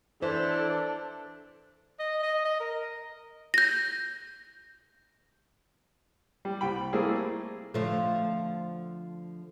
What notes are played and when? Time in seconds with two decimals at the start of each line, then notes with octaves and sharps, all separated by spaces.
0.22 E3 D4 A4 C5
1.99 D#5
2.23 D#5
2.45 D#5
2.60 A#4
3.54 G6 A#6
6.45 G3
6.61 C2 G5 B5
6.93 G3 A3 A#3 C4 E4 G#4
7.74 D3 F3 A3